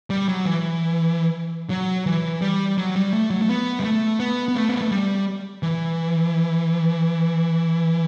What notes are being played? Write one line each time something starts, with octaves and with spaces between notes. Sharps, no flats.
G3
F#3
E3
F#3
E3
G3
F#3
G3
A3
F#3
A3
B3
G3
A3
B3
B3
A3
B3
A3
G3
E3